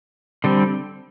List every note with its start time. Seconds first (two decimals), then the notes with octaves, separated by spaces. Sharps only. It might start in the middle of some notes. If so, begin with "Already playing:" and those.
0.44 D3 G3 C4